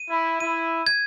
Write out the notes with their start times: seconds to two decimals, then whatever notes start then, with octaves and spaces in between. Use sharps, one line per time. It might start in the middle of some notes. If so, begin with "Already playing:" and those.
Already playing: D#7
0.10 E4
0.40 E4 D#7
0.87 G#6